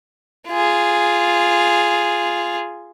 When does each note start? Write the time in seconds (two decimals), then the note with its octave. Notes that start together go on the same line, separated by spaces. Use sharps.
0.49 F4 G#4